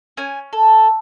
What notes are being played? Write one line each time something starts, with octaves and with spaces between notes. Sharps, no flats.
C#4 G#5
A4